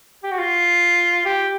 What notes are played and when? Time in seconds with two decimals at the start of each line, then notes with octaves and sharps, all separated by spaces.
0.23 G4
0.31 F#4
0.39 F4
1.25 G4